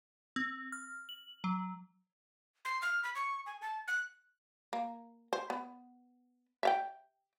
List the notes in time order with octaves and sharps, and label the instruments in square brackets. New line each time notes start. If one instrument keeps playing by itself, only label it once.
[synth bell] C4
F6
F#7
F#3
[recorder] C6
F6
B5
C#6
G#5
A5
F#6
[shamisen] A#3
C5
B3
E5 F5 G5